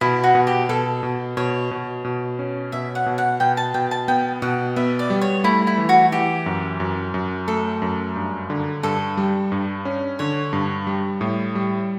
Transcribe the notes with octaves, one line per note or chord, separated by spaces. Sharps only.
B2 E4
F#4
B2
G4
B2 A4
B2
B2 C#5
B2
B2
C#4
B2 E5
F#5
B2
F#5
B2 G5
A5
B2 G5
A5
B3 G5
B2 F#5
B3 E5
D5
G3
C#5
A3 E4
E4
E3
F#4
E3 G4
F#2
F#2
F#2
A3 A4
F#2
G2
D3
G2 A4
G3
G2
C#4
D3 C#5
G2
G3
A2
G3